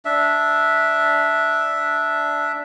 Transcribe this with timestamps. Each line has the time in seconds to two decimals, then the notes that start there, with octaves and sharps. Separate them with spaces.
0.05 D4 E5